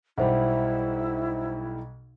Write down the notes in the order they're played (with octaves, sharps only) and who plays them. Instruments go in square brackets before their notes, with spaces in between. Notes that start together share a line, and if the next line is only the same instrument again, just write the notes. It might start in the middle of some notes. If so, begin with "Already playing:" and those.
[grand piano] B1 G3 [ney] E4 [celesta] C5 E5 F#5